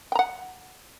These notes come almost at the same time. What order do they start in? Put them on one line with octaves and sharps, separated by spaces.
G5 A#5 F#5